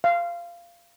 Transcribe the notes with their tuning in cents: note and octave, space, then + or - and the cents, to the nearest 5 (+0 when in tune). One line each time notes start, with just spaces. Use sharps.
F5 -15